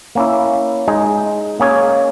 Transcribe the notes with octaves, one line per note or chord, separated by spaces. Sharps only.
A#3 C#4 E4
G#3 D#4 G#4 D#5
A#3 C#4 G#4 C#5